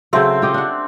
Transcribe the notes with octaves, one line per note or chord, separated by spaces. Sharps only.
C#3 F#3 A3 C4 C6
F4 G4 D#5
D4 F#5